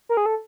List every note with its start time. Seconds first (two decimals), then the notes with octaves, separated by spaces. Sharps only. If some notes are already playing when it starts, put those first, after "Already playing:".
0.09 A#4
0.17 G#4
0.26 A4